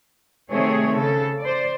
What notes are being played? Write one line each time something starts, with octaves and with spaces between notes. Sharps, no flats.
C3 D#3 A3 C4 G#4 C#5
C#3 A4
C5 D5